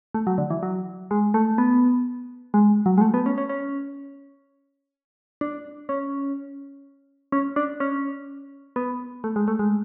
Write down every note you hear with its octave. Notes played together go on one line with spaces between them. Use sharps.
A3
F#3
D3
E3
F#3
G#3
A3
B3
G#3
F#3
G#3
A3
B3
C#4
C#4
C#4
D4
C#4
C#4
D4
C#4
B3
A3
G#3
A3
G#3